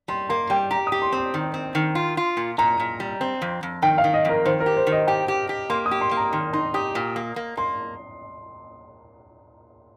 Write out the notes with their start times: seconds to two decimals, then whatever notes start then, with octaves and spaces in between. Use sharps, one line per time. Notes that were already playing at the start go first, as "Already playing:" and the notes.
0.08 G3 C6
0.29 A#3 C6
0.50 G3 G5
0.71 G4 A#5
0.87 D#6
0.92 G4
1.02 C6
1.12 C4 C6
1.34 D#3
1.54 C4
1.75 D#3
1.95 F4
2.17 F4
2.37 A#2
2.58 A#2 A#5
2.80 A#2
3.00 G3
3.21 C4
3.42 F2
3.63 F2
3.82 D#3 G5
3.98 F5
4.04 D#3
4.14 D#5
4.25 F2 A#4
4.45 D#3 C5
4.60 A#4
4.66 G4
4.77 C5
4.87 D#3
4.92 D#5
5.07 G4 G5
5.28 G4
5.49 G4
5.70 A#3 C6
5.86 D#6
5.91 G4
6.01 C6
6.11 A#3
6.17 A#5
6.33 D#3 C6
6.53 D#4 C6
6.74 G4 D#6
6.95 A#2
7.16 A#3
7.36 A#3
7.57 A#3 C6